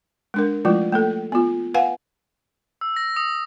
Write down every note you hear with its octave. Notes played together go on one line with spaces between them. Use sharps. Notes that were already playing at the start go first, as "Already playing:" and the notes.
G#3 D4 A#4
F3 G#3 A3 E4 F4
A3 A#3 A4
B3 F4
B4 F5 F#5 G#5
E6
A#6
D#6